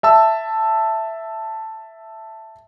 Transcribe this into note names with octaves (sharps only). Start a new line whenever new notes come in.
E5 A5 E6